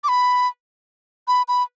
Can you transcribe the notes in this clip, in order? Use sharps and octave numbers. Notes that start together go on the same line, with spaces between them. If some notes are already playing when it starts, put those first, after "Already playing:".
D6
B5
B5
B5